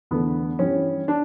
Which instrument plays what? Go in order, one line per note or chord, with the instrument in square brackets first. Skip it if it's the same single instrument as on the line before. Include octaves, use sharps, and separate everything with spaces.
[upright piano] E2 D3 A3 B3
G2 E3 G3 C#4
D4